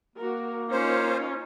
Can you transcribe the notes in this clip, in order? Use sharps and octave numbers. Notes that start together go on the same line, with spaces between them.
A#3 F#4 A#4
C#4 D#4 F4 C5